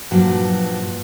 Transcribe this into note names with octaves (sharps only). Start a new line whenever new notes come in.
G2 A#2 F3 F#3